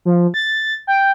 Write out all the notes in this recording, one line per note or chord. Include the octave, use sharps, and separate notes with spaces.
F3
A6
G5